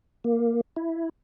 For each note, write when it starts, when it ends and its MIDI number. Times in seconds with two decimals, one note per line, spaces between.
0.24 0.61 58
0.76 1.09 64